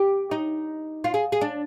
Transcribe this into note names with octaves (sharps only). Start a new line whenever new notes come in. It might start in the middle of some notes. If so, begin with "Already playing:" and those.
Already playing: G4
D#4
F4
G#4
G#4
D4